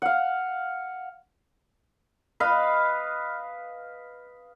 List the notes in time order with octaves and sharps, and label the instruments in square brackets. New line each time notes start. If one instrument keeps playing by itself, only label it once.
[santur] F5 F#5
[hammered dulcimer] B4 D#5 F5